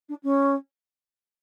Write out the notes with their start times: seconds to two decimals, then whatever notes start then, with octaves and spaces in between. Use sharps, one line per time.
0.09 D4
0.23 C#4